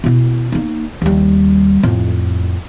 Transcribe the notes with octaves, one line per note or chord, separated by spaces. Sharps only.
B2 E4
A#3 D#4
D#2 G3
F2 A2